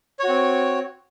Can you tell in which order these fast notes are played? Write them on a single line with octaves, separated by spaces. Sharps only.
C#5 F#4 C4